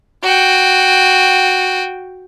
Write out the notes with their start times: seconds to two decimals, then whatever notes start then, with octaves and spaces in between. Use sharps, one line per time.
0.23 F#4 G5